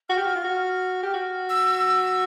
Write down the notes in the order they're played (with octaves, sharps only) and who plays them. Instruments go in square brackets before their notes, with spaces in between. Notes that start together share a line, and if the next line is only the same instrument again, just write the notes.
[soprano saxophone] F#4 [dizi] F6
[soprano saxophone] G4
F#4
F4
F#4
G4
F#4
[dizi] E6